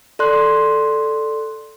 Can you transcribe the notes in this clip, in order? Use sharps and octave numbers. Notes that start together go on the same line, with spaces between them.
A4 D5 C6 F#6